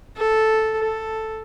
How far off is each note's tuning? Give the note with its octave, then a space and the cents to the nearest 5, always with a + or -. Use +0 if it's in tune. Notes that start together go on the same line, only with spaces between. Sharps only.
A4 -5
A4 +5